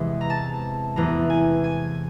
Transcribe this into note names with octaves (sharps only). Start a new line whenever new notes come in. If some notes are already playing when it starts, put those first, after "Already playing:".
Already playing: E2 C3 E3 G#3 C4
A#5
A5
E2 C3 E3 A3 A#5
G#5
G#5